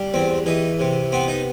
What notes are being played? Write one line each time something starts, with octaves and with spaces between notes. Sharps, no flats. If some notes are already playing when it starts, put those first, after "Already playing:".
Already playing: G3
E2 C4
E3 D#4
C3
B3 C4
D#4